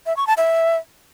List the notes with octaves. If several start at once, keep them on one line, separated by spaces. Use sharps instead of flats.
E5
C#6
A5
E5